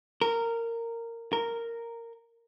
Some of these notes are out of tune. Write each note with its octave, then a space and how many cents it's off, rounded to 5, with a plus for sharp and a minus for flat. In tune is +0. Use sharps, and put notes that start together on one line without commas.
A#4 -15
A#4 -10